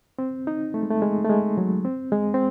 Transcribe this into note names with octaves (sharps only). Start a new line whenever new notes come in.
C4
D#4
A3
G#3
A3
G#3
A3
G#3
F#3
C4
G#3
C4